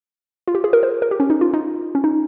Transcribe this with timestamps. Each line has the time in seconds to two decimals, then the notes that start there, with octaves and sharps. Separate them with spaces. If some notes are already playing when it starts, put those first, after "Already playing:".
0.48 F4
0.55 G4
0.64 G#4
0.73 A#4
0.83 C5
1.02 A#4
1.11 G4
1.20 C#4
1.30 D#4
1.41 F4
1.54 D#4
1.95 C#4
2.04 D#4